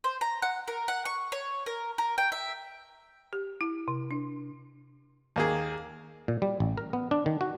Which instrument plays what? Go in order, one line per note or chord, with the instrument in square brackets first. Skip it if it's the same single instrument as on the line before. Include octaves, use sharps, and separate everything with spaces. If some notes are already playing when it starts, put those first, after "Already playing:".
[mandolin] C5
A#5
F#5
A#4
F#5
C#6
C#5
A#4
A#4
G5
E5
[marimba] G4
E4
C3
D4
[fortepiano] D#2 A#3 G#4
[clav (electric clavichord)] A#2
G3
A1
A#4
B3
D4
D#3
F#4